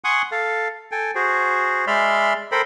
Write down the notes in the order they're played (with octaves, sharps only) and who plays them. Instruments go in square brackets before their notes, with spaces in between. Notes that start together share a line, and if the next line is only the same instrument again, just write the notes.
[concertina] F#5 G#5 C6 C#6 D#6 F#6
A4 F5
A4 G5 G#5
F#4 G#4 C5
G#3 D5 E5 B5 C6 F6
A4 A#4 C5 G5 B5